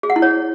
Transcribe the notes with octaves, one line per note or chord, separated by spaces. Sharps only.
G#4
F#5
E4
C#5